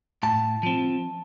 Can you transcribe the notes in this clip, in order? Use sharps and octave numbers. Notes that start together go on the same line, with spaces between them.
A2 A5
F3 C4